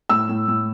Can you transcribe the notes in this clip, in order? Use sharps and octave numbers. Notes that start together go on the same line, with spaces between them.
A2 E6
A2
A2